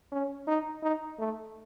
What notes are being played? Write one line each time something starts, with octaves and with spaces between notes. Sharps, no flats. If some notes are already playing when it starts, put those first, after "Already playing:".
C#4
D#4
D#4
A3